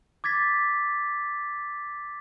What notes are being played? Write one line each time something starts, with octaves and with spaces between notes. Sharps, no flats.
D6 G#6 A6 B6